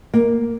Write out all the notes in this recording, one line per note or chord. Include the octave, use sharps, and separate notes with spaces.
A#3